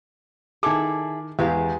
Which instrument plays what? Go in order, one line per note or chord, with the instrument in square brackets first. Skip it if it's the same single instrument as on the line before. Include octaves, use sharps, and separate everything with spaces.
[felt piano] D#3 D6 [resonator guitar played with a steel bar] E4 G#4 A4
[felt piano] E2 [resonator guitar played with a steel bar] G#3 G4 F5